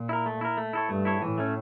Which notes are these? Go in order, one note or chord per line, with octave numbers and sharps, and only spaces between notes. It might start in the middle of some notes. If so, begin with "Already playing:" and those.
Already playing: A#2
E4 A#4
A3
E4 A#4
A3
E4 A4 C#5
G2 A3
E4 A4 C#5
A2 E3
A3 C#4